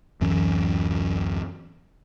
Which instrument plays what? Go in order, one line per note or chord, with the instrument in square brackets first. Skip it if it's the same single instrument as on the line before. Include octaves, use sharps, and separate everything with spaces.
[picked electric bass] D1 F#2 E3 C#4